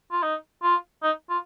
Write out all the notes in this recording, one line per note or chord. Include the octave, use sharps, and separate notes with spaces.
F4
D#4
F4
D#4
F4